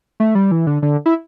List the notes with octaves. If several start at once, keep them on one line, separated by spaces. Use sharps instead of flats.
A3
G3
E3
D3
D3
E4